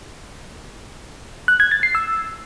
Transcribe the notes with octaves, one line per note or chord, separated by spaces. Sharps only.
F#6
G#6
A6
C7
E6